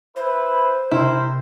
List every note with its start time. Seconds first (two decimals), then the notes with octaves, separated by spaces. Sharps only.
0.16 E4 B4 C5
0.91 C3 E4 A#4 C5